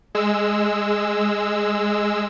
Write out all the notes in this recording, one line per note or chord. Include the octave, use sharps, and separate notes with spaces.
G#3 E6